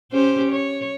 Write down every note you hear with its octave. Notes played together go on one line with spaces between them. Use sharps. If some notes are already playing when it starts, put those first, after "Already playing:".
C#4 G4 C5
C#5